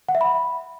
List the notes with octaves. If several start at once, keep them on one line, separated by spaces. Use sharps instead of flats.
F#5
E5
B5